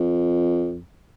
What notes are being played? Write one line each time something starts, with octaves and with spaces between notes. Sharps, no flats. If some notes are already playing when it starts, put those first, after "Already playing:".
Already playing: F2